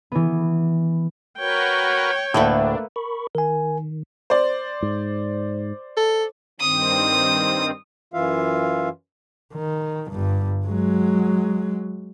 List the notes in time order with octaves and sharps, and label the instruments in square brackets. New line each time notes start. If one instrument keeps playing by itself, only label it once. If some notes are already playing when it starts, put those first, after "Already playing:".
[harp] E3 B3
[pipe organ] F#4 A#4 B4 [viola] C#5 G5
[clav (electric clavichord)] D2 A2 [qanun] A3 A#3 B4 [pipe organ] D4
[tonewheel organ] A#4 B5 C#6
[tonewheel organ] D#3 [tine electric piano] A#4 G#5
[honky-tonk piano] C5 D5
[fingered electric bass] G#2
[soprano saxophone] A4
[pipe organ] G2 D#3 C4 [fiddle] D#6
[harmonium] F#2 E3 F4 E5 F5
[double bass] D#3
G1 G2
F#3 G#3